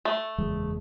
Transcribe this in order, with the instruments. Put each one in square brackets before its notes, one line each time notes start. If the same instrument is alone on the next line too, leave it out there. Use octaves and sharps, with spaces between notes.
[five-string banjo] A3
[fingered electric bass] F#1 E2 G#3